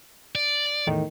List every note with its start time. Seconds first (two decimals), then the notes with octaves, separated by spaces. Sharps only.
0.35 D5
0.87 E2 A2 D#3